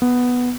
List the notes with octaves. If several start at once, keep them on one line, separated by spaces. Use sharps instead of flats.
B3